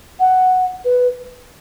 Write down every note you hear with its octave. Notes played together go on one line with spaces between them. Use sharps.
F#5
B4